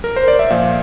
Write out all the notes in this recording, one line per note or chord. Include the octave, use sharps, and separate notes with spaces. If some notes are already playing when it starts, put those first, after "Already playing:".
A#4
C5
D5
E5
A#2 F3 F5